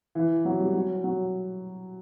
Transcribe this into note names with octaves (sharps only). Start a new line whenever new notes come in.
E3
F#3
G3
F#3
F#3